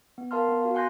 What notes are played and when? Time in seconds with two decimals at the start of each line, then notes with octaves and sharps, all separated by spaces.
0.18 B3
0.31 A#4 F5 A5 C6 F6
0.49 B3
0.62 F#4 F5
0.75 F#5 G#5 C6 F#6 G6 A#6